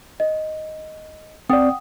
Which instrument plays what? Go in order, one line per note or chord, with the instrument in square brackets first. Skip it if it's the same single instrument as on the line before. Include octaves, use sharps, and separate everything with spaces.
[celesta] D#5
[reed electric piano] C4 D5 [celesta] F#5 G5 D#6